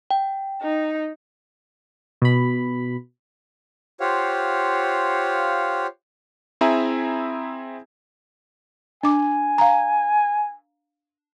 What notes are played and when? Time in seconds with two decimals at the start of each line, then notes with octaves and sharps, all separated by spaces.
0.11 G5
0.62 D#4
2.22 B2 B5
4.00 F4 G4 C5 C#5 F5 F#5
6.61 C4 E4 G#4 E5 G#5 A#5
9.03 D4 G#5 D6
9.58 F5 A#5